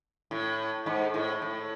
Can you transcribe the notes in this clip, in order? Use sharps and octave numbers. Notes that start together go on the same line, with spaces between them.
A2
G#2
A2
A2